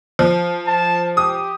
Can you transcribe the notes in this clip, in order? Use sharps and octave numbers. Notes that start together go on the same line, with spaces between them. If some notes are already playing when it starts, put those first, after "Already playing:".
F3
A5
G4 D#6